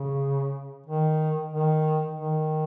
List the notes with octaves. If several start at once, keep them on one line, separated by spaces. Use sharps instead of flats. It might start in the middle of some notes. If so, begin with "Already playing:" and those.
Already playing: C#3
D#3
D#3
D#3